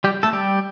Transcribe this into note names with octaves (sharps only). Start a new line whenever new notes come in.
G3 G4
A3 A4
G3 G4